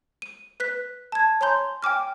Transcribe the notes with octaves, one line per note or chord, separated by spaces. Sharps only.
D#7
B4 F#6 B6
A5 G#6
C#5 G#5 A#5 C6 G6
G5 G#5 D6 F6